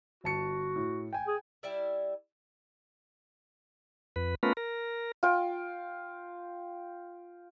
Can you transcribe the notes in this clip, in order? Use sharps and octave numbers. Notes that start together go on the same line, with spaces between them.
G1 F#4 A5 C#7
A2
G5 G#5
G#4
G3 E4 D5 E5
F2 B4
A3 B3 C#4 F4 A#4 B4
A#4
F4 G5